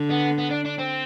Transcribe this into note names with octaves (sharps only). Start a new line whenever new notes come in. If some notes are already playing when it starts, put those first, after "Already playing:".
Already playing: D3
B3
B3
D4
D4
C4